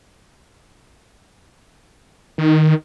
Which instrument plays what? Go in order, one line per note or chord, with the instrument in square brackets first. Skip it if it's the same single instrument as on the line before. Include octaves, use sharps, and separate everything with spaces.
[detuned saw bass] D#3